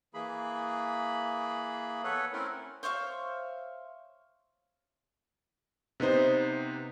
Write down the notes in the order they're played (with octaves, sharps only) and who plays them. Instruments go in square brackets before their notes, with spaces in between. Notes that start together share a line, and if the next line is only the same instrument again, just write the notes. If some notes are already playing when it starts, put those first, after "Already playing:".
[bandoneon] E3 A#3 G#4 B5
B3 A4 B4 C#5
A3 C4 C#4 E4 A4 A#4
[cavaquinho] C5 C#5 E5 F5
[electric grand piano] C3 B3 D#4 C5